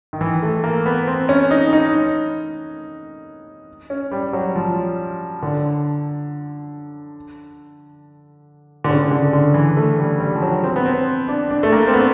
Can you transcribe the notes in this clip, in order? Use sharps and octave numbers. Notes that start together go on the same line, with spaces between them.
D#3
E3
A3
A#3
B3
C4
C#4
D#4
D#4
C#4
G3
F#3
F3
D3
D3
C#3
D3
D3
E3
A3
G3
G3
F3
F#3
C4
B3
C4
D4
D4
A3
A#3
C4
B3